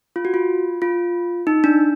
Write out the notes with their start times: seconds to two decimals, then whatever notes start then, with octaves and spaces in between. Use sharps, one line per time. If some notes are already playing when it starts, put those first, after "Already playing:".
0.16 F4
0.25 F#4
0.34 F4
0.82 F4
1.47 D#4
1.64 D4